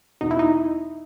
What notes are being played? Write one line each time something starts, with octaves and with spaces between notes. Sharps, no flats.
E2 B2 D#4
E4
D#4